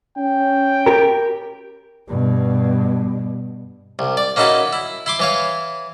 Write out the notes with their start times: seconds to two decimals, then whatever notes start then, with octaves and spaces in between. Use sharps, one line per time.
0.17 C#4 G5
0.86 G4 A#4
2.09 G2 B2
3.99 C2
4.17 D5
4.36 A#3 C#4 D#4 E4 F#4 A4
4.73 E4
5.06 E4 C6 D6
5.19 E3 C#5 F5